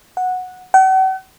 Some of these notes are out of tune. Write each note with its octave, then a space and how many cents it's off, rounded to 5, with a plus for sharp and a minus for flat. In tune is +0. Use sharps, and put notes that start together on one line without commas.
F#5 -10
F#5 +45